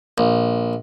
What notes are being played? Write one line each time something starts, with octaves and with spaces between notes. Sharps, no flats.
A#1